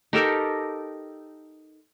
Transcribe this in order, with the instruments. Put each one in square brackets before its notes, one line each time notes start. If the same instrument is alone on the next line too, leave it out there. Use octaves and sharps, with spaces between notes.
[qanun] D#4 G4 A4 A#4